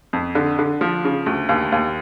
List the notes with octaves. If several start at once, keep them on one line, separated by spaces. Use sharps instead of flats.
F2
D3
D3
F3
C#3
D2
D#2
D#2